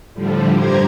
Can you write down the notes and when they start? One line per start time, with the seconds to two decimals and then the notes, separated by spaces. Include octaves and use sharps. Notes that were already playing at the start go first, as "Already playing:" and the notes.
0.14 A2 D3 F3 G3
0.56 G2 G4 C5 A#5 G#6